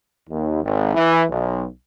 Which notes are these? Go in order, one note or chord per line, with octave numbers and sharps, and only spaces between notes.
D#2
G#1
E3
B1